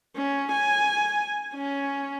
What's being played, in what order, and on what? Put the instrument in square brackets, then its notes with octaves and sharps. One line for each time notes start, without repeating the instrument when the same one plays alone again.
[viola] C#4
G#5
C#4